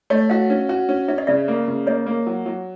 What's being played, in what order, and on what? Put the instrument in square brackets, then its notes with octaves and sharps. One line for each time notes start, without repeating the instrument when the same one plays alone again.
[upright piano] A3 [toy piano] C#5 D#5
[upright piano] F#4 [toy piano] D#5 F5
[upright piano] C#4
F#4
C#4
[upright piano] C#4 [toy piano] E5
[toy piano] D#5
[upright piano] C#3 [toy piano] D5 E5
[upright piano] A#3
C#3
[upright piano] A#3 [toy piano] C#5 D#5
[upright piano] A#3
F#3
F#3